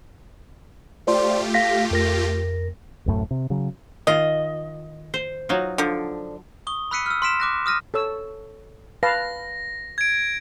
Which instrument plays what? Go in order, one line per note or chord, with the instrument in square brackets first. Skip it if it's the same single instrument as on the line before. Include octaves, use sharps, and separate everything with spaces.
[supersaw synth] A3 F4 G4 [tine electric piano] C5 D5 C6
[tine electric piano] F5 A#6 B6
F2 A#4 A#6
[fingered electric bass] D1 F#2 A2
C3
C#3 F#3
[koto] D#3 F4 [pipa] D#5
[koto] C5
F#3 D#4 F4
[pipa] D3 F3
[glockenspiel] C#6 D#6 G7
B5 E6 F#6 B6 C#7 D#7
E6 F6
C6 F6 B6 D7 E7
D6 F#6 A#6
D#6 F6 A#6 D#7
[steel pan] A4 C#5 E6
[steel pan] B4 F5 A5 [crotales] A#6
[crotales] G#6 D7